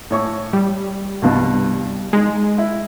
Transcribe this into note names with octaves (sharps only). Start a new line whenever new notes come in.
A2 C#5 C#6
G3
C2 G2 B2
G#3 D#4
E4